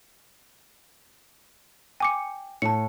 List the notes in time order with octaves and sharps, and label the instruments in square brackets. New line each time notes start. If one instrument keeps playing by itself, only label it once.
[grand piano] G5 [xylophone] G#5 D6 C#7
[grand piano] A2 [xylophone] A5 C#7